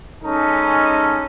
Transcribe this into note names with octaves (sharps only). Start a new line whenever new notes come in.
G#3 C#4 D#4 A4